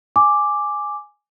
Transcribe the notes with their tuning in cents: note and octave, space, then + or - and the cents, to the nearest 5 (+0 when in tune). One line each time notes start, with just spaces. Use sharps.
G#5 +0 D6 +0